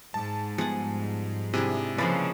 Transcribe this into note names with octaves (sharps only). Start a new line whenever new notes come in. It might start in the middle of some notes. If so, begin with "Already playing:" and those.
G#2 A5
F3 G3 B3 G#4 F#5
C3 D4 E4 G#4
C#3 F3 G#3 A#3 B4 D5 B5